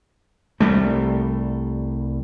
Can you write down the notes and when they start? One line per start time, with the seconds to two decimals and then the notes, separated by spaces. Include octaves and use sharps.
0.60 C2 G3 A3